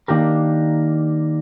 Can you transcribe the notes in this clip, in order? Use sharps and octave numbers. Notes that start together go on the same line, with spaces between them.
D#3 A#3 D4 G4 A#4